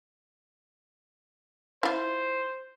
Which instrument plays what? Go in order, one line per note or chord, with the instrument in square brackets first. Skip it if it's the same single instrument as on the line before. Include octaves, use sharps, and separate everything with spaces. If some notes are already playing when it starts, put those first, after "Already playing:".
[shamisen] E4 F4 [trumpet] C5